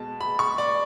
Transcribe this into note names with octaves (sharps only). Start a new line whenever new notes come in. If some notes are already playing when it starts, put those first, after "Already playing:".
Already playing: B2 G#3 A5
B5
C#6
D5